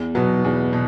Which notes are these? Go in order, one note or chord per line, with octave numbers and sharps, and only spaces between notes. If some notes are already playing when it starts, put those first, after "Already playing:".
Already playing: E2
B2 F#3 B3
E2
B2